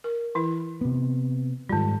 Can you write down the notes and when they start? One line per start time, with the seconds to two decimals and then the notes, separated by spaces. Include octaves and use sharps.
0.04 A#4
0.35 E3 E4
0.81 C3 B3
1.69 G#2 D#3 G3 F4